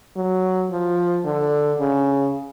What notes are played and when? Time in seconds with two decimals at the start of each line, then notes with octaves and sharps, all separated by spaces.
0.17 F#3
0.71 F3
1.25 D3
1.79 C#3